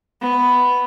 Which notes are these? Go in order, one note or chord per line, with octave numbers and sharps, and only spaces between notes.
B3